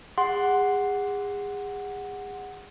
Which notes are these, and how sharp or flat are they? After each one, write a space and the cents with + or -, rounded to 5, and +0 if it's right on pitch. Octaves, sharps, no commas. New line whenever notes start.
G#4 -35 F#5 +0 C6 +0